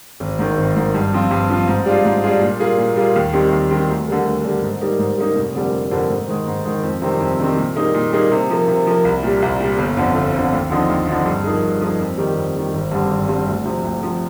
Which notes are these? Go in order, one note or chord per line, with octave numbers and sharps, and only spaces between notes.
G#1
G#2 D#3
G#1
G#2 D#3
G2
F3 C4 F4
G2
F3 C4 F4
G#2
G3 D4 F4 G#4
G#2
G3 D4 F4 G#4
A#2
G3 A#3 F4 G#4
A#2
G3 A#3 F4 G#4
D#2
D#3 G3 C4 G4
D#2
D#3 G3 C4 G4
D2
D3 G3 A#3
D2
D3 G3 A#3
G#2
G3 A#3 D#4
G#2
G3 A#3 D#4
F1
F2 D3 G3 A#3
F1
F2 D3 G3 A#3
G#2
D#3 G#3
G#2
D#3 G#3
F2
C3 D#3 G3 C4
F2
C3 D#3 G3 C4
A#2
G3 A#3 D#4 G#4
A#2
G3 A#3 D#4 G#4
C3
F3 A#3
C3
F3 A#3
C2
A#2 G3
C2
A#2 G3
G1
F2 D3
G1
F2 D3
D#2
D3 F3 C4 D#4
D#2
D3 F3 C4 D#4
G2
F3 A#3 D#4 G#4
G2
F3 A#3 D#4 G#4
F2
D#3 G3
F2
D#3 G3
G#1
G2 D3 G3 C4
G#1
G2 D3 G3 C4
D2
C3 F3
D2
C3 F3